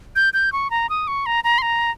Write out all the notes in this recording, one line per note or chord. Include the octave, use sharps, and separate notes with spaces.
G6
G6
C#6
A#5
D#6
C#6
A#5
A#5
C6
A#5